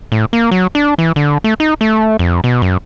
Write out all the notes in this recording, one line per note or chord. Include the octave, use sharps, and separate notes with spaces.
A2
A#3
F#3
D4
E3
D3
A3
D#4
A3
F2
B2
F#2